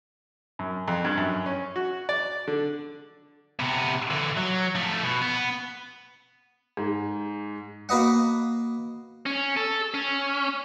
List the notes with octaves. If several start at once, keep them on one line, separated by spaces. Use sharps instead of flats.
F#2
F2
G2
F#2
C#4
F#4
D5
D3
C3 B3
D3 E3
F#3
F3 A3
B2
B3
G#2
A#3 F#4 B4 D#5 F#5
C#4
A4
C#4